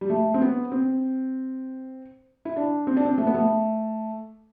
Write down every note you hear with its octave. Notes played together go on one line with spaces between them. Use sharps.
G3
A3
C4
B3
C4
E4
D4
C4
D4
C4
A3
B3
A3